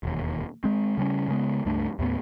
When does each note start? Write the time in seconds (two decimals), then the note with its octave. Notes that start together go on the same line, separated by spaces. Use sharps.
0.03 E1 D#2
0.64 G#3 C4
0.98 C#3 G3 B3 C#4
1.28 C#3 G#3 B3
1.65 C#2 G2 A3 D4
1.99 D#2 A2 B3